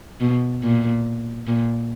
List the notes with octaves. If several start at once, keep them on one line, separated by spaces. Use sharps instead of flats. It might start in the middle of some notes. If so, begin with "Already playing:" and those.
B2
A#2
A#2